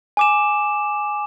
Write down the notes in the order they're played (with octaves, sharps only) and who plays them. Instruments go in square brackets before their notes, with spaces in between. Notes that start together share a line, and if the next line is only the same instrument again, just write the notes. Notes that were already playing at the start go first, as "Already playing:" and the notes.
[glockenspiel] G#5 D6 E7